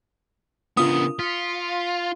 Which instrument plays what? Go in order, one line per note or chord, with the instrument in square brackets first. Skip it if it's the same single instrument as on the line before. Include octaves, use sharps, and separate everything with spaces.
[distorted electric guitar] C#3 B3 [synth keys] D4 F4 A#4 [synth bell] D#6
[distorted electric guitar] F4 [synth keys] B6 C#7